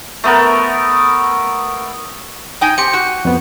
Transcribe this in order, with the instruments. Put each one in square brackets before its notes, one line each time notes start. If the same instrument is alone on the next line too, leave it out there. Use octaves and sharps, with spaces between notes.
[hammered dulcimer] A3 B3 A#4
[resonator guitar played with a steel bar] D#4 G5 G#5
[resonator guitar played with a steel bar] C4 G4 [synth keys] C#7
[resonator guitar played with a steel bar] F#4
[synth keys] F2 B3